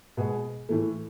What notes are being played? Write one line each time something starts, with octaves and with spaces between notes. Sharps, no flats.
B2 G#3 B3 G#4
A2 E3 A3